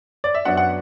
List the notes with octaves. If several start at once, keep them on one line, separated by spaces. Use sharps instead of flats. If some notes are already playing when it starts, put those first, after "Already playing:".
D5
E5
F#2 F#3 B3 D4 F#5
F#5